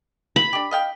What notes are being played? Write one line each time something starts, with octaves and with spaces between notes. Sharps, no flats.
B5
D4 G4
D#5 F5 G5